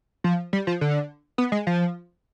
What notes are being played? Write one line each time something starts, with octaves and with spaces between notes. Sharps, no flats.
F3
G3
F3
D3
B3
G#3
F3